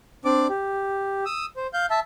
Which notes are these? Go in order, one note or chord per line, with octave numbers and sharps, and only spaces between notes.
C4 D4 D5 D6
G4
D#6 E6
C5
F5 G6
E5 A5